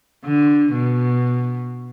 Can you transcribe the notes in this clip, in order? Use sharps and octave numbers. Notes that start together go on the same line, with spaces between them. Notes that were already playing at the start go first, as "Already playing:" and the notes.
D3
B2